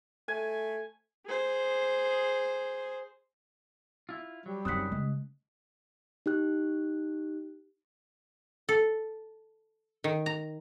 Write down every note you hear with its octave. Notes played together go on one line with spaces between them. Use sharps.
A3 G#5
G#4 C5
E4 F4
F#3 G3
F#2 D#3 C4 F#5 D#6 F#6 B6
C#3 G#3
D#4 G4 F#6
A4
D#3
A#5